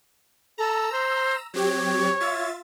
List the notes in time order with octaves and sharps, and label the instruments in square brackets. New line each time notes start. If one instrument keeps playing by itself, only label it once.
[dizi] A4 [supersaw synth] A#5 E6
[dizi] C5
[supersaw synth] F#3 C4 G4 [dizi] C#5
[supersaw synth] F4 E5 A6